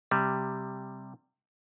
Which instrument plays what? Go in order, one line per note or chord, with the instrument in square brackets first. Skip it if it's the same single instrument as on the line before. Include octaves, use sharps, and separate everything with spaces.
[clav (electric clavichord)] C3 G3